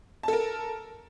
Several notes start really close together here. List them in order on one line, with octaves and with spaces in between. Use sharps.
A5 A4 A#4